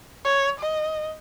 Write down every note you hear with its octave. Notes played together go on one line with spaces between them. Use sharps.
C#5
D#5